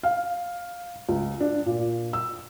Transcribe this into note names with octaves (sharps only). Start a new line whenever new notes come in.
F5
C#2
D4
A#2
E6